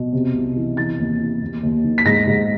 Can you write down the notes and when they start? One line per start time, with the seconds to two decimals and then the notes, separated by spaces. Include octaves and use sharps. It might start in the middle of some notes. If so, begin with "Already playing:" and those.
Already playing: B2
0.13 C3
0.34 C2
0.56 E3
0.76 E3 A6
0.99 D#2
1.20 E3
1.42 D#2
1.63 D#2
1.84 D#3
1.98 B6
2.05 G#2 A#6
2.27 G#2